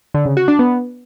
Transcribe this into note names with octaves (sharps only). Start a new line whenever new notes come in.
D3
C#3
F#4
D4
B3